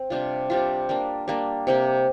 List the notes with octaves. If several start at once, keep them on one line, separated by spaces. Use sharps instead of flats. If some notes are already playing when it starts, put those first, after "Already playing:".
Already playing: C4
C3 G3 D4 F4
C3 G3 D4 F4
G3 A#3 D4
G3 A#3 D4
C3 A#3 G4